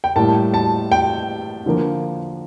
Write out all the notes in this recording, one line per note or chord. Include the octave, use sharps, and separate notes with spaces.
G5
A2 G3 A#3 A5
A5
G5
D3 F3 A#3